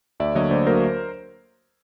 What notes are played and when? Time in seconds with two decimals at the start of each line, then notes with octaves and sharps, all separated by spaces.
0.20 D2 D5 E5
0.35 D3 F#3 A#3 C#5 D#5
0.51 D2 C5 D5
0.66 D3 F#3 A#3 A#4 C5